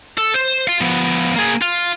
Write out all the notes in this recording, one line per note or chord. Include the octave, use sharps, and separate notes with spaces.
A4
C5
F5 C6
F3 B3
A#3 G#4
F4